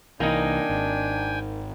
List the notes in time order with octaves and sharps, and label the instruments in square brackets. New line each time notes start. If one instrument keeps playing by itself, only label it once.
[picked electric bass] C2 E3 [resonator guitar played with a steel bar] A#3 D#4 [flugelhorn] D4 [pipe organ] G5 G#5
[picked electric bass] G#1